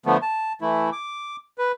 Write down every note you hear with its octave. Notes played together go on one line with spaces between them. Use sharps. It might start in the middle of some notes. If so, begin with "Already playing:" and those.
D3 F3 A3 B3
A5
E3 A3 E4
D6
B4